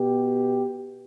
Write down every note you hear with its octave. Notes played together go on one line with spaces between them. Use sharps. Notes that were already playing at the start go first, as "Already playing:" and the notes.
Already playing: B2 B3 G4